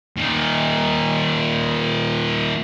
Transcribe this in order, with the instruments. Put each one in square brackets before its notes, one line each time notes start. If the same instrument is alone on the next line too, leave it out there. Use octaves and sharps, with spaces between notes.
[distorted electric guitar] A#2 D#3